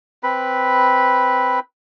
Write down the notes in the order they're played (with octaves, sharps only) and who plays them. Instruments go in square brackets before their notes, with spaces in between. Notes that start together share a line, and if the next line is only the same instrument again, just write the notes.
[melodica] C4 B4 B5